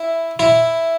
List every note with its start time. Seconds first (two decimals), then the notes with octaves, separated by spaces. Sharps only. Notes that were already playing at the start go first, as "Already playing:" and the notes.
Already playing: E4
0.39 E4